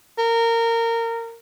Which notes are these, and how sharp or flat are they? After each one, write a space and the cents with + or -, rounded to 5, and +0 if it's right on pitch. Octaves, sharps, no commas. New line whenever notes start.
A#4 -20